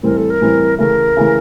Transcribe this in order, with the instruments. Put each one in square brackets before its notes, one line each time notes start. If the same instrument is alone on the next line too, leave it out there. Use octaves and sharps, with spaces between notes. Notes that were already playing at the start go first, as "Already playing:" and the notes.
[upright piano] A2 E3 G3 C4 [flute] A#4
[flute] A4
A#4
[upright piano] A2 E3 G3 C4
[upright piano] C#3 E3 A3 [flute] A#4
[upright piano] C#3 E3 A3